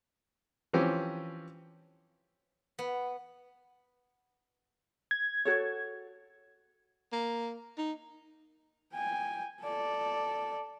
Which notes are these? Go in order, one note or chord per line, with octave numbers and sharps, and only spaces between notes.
E3 F3 C4 C#4 G4
B3
G#6
F#4 A4 C#5
A#3
D#4
G5 G#5
A4 D5